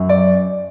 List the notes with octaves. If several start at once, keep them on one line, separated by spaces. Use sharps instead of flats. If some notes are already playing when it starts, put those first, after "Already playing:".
Already playing: F#2
D5